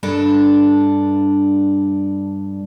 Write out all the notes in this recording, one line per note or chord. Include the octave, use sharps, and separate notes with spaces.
G2 D4 A4